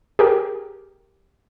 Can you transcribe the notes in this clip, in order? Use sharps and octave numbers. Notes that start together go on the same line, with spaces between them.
G4 G#4 A#4